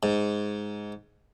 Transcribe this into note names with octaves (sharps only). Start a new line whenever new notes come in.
G#2